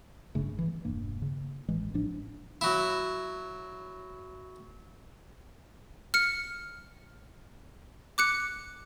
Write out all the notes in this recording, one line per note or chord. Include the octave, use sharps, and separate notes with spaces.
G1 G2 C#3 A3
G1 E3
E1 G2 A#3
C#3
A1 E3 G#3
A1 A2 F3 D4
F#3 E4
F6 C#7
D6 F#6 C#7